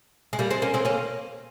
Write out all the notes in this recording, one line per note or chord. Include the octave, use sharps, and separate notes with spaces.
G#3
G3 A#3
G#3 C4
A#3 C#4
G#3 C4
A#3 C#4